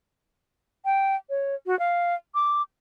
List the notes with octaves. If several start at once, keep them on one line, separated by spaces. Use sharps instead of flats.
G5
C#5
F#4
F5
D6